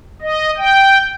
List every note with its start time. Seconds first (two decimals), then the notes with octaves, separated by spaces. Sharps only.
0.22 D#5
0.58 G5